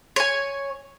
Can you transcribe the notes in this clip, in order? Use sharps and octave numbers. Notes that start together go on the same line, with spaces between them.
C#5 G#5